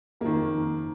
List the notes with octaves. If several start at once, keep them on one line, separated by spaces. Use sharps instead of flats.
F#1 F2 D#3 A#3